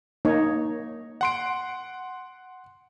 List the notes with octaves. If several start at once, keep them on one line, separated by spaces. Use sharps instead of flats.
A#3 D#4 C#5
F#5 C6 D7